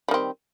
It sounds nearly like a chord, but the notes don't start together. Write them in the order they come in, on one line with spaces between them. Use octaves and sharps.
G3 D#3 C4